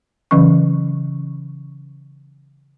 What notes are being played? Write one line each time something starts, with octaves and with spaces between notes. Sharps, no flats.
C#3 E3 F#3 C#4 C#6